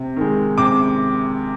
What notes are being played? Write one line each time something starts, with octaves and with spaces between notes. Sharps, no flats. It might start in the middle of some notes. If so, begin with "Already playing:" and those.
Already playing: C3
D#3 G#3
C3 D6